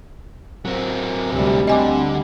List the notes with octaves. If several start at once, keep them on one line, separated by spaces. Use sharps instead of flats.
F#3 C4 A#4
D2 C3 G3
D3 C4 D#5 G#5 D6